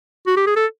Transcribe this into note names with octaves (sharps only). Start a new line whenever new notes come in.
F#4
G4
G#4
A4